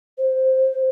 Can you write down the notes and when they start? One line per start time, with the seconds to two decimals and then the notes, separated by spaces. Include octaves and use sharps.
0.18 C5